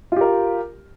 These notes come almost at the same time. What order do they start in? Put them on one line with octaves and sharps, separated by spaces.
F4 G4 A#4